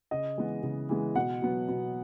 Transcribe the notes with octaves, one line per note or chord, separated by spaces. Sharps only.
C#3 D#5
E3 G#3 B3
C#3
E3 G#3 B3
B2 F#5
F#3 B3
B2